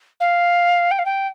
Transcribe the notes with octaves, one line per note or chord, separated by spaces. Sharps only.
F5
G5
F5
G5